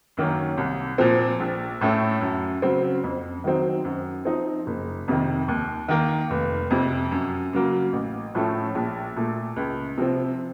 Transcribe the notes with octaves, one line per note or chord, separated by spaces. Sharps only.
F#2 D#3 A#3 C#4
C2
A#2 F3 C4
A#1
A2 A3 C#4
F#2
C#3 F#3 C4
F2
D#3 F#3 C4 D#4
F#2
F3 C4 D#4
F#1
F2 C3 D#3
D#2
D#3 A#3
F1
F2 C3
F#2
C#3 F#3 A#3
A1
A2 F3 A3 C#4
A#1
A#2 A3
C#2
C3 F3 C4